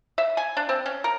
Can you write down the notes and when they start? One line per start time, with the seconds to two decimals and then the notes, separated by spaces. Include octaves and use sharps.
0.18 E5
0.37 G#5
0.57 D4
0.69 C4
0.86 C#4
1.04 A#4